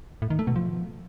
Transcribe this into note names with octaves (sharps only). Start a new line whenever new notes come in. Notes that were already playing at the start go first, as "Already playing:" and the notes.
A2
D#3
A3
B2
F3